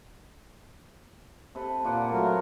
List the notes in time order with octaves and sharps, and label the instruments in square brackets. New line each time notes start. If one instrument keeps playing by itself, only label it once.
[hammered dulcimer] C3 A4 B4
[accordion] A#2 A#3 [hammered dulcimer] F4 D5 F#5
[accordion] F#3 A3 A#4